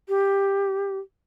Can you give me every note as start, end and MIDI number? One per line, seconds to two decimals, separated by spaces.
0.09 0.99 67